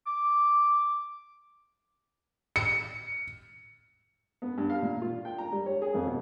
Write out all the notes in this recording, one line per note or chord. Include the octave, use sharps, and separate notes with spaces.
D6
C#7
B3
G2
F5
A#2
F4
G5
A#5
G3
C#5
G#4
F2
B2